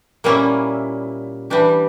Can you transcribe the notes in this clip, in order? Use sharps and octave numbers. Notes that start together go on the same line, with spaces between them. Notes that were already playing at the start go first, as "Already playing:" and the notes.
A#2 G3 A#3 C#4 E4
E3 G3 D4 G4